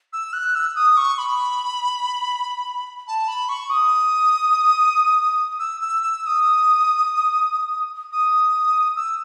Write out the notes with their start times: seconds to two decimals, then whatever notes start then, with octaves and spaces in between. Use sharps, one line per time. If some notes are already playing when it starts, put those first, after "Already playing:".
0.13 E6
0.33 F#6
0.55 E6
0.76 D#6
0.97 C#6
1.18 B5
3.08 A5
3.28 B5
3.49 C#6
3.70 D#6
5.59 E6
5.81 E6
6.03 E6
6.23 E6
6.27 D#6
8.12 D#6
8.96 E6